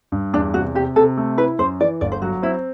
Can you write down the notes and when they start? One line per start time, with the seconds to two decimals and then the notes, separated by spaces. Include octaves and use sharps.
0.12 G2
0.33 E2 D4
0.54 C3 F#4
0.75 C3 G4
0.96 C3 A4
1.17 A3
1.37 E4 B4
1.59 F#2 C5
1.81 E3 D5
2.01 G1 D5
2.12 C5
2.22 F#3 F#4
2.42 C4 E4